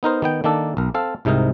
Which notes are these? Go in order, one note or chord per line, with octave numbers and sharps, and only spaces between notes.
B3 D#4 A#4 C5
D#3 B3 G5
D#3 A#3 D4 A4
B1 A#4
C4 A4 F5
C2 G#2 C3 D#4 A#4